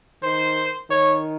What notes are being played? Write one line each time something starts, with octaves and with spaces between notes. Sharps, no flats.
D#3 C5
D#3 C#5